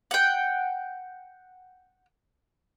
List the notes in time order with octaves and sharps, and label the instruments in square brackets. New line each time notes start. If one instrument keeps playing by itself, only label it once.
[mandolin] F#5 G5